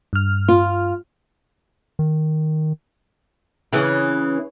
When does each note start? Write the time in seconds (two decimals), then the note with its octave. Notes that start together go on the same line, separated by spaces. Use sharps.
0.13 G2 F6
0.48 F4
1.99 D#3
3.73 C#3 E3 C#4